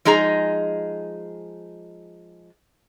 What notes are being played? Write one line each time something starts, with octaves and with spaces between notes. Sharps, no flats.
F3 G#3 D#4 G#4 A#5